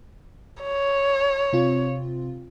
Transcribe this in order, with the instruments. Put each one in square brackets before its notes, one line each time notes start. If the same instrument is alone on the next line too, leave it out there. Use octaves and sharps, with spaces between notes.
[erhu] C#5
[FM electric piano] C3 C4 F4